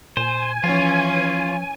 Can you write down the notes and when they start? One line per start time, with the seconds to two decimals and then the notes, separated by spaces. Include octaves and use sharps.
0.17 A#2 C5 G#5
0.64 E3 F3 C#4 F4